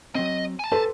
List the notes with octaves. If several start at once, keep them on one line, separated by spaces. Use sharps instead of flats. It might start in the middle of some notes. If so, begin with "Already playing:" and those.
F#3 C4 D#5
G#5 A5
G4 A4 B4 C5